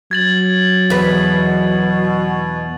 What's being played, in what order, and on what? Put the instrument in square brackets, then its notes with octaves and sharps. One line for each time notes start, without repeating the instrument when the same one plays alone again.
[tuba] F#3 [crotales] G#6 A6 F#7
[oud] E2 B4 [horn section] B2